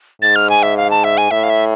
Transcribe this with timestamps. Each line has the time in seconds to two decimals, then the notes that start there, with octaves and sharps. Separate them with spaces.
0.22 G#2 A6
0.36 F6
0.50 G#5
0.63 E5
0.77 F5
0.91 A5
1.04 E5
1.18 G#5
1.31 A2 E5
1.43 F5
1.50 E5